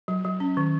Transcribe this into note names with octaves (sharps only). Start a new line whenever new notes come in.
F#3
F#3
C#4
D#3